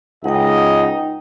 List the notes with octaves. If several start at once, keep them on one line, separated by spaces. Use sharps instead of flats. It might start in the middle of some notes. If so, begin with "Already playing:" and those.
C#2 D#4 D#5 F#5 G5